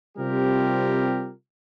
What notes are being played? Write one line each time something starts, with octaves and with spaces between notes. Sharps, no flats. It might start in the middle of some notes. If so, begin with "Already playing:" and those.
C3 G3 C4 F4 G4 A#4